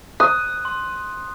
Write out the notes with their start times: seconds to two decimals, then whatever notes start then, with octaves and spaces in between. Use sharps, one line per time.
0.20 D#6 F#6
0.65 C6